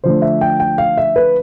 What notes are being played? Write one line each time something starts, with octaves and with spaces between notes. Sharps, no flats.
D3 F3 A3 D4 C5
E5
G5
G5
F5
E5
B4